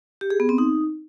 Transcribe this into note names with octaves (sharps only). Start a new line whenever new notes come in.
G4
G#4
B3
C4
D#4